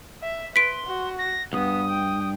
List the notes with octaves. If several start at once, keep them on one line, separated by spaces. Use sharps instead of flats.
E5
B4 C6 B6 D7
F#4
A#6
C#2 G2 B3 D#6
G5